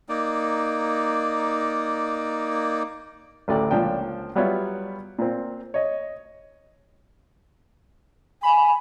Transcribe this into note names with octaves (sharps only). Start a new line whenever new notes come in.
A#3 D#4 D5
A1 D2 A3 D5 G5
C#2 A#2 F3 D4 G5
F#3 G3 B3 F4 C#5 E5
A#2 C4
C#5 D#5
G#5 B5